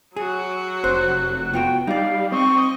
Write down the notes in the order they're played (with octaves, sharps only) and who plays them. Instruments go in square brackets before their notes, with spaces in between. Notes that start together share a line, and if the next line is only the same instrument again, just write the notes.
[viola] F#3 F#4 [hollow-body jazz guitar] G#4
[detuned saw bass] F1 [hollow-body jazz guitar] C5 [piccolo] F#6
[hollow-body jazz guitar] B3 F4 F#4 [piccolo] G5
[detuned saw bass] G3 [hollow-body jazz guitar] D#4 D5 [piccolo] F5
[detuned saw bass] C4 [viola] D#5 [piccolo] C#6